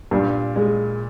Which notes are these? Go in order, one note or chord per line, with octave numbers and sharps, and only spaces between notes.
G2 A#2
G#3